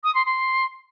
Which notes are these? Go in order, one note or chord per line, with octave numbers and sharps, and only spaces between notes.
D#6
C6
C6